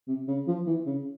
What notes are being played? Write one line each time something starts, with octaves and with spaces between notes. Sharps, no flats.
C3
C#3
F3
E3
C#3